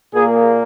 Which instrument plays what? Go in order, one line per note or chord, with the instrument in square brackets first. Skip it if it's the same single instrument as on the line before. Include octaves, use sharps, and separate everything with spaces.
[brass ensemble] A#2 A#3 G#4